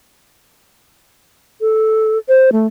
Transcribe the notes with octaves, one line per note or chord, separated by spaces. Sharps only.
A4
C5
A3